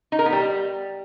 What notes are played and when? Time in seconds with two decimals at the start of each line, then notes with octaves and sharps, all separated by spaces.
0.12 D#4
0.19 A#4
0.26 B3
0.32 G3